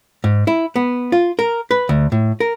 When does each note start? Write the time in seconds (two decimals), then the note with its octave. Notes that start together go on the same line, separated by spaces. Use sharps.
0.24 G#2
0.47 E4
0.76 B3
1.12 F4
1.39 A#4
1.71 B4
1.89 D2
2.12 A2
2.40 A#4